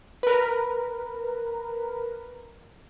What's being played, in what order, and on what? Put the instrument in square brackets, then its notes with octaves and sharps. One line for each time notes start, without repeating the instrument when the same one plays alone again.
[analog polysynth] A#4 B4